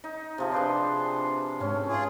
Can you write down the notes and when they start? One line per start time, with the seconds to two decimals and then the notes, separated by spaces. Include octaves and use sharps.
0.04 D#4
0.38 C3 F3 G#4
0.52 C3 D4 B4 D5 C6
1.60 G#2 A3 C#4
1.89 F4 G#4